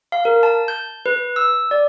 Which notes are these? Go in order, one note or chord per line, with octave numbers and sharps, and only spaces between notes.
F5
A#4
A5
G6
B4
E6
D5